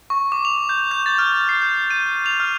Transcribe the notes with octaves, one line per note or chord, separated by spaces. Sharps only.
C#6
D6
F7
G6
G6
A6
F6
C7
G6
D#7
F7
F6